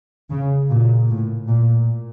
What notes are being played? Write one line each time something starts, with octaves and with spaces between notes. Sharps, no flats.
C#3
A#2
A2
A#2